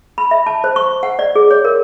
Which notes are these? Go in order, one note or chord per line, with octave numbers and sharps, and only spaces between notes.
B5
E5
A5
C5
C#6
F#5
D5
G#4
C#5
A#4